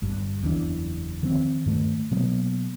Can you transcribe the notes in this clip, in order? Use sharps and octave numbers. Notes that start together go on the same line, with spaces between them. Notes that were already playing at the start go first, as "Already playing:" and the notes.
G1 G2
F#1 E2 E3 D4
D#3 F3 C4
G2 D#3 A3
B2 F#3 A#3 B3